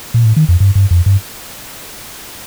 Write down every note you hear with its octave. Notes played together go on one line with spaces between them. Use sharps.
A#2
A2
D#3
F2
G2
G2
F2
G2